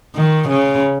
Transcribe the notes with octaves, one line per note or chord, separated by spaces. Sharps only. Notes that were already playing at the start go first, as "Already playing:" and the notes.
D#3
C#3